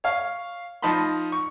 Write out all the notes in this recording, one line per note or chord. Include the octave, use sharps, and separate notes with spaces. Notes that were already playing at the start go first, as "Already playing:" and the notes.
C#5 F5
F3 D#4 A5 B5 C6
C#6